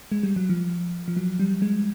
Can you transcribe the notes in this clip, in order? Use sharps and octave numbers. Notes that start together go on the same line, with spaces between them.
G#3
G3
F#3
F3
F3
F#3
G3
G#3